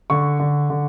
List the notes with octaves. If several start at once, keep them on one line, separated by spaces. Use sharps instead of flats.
D3 C#6
D3
D3